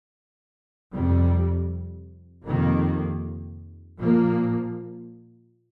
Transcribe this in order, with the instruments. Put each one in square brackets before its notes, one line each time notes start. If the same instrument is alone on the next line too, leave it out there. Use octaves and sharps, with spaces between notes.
[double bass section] F2 C3 G3
F2 C3 D#3 A#3
A#2 F3 A#3